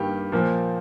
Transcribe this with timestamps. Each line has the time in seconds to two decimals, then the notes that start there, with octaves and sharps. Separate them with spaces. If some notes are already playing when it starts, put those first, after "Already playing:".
Already playing: G2 D#3 A#3 G4
0.32 A#2 F3 A#3